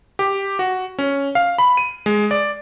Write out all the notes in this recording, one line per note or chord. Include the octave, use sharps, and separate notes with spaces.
G4
F#4
C#4
F5
B5
D#7
G#3
D5